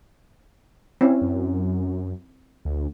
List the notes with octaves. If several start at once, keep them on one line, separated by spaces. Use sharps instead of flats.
C4 C#4 E4
F#2
D2